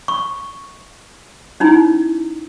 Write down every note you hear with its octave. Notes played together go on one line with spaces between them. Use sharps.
C#6
C#4 D#4 E4